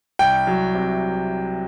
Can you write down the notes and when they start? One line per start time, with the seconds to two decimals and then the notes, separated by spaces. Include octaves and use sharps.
0.19 C2 G5
0.47 F#3
0.75 C3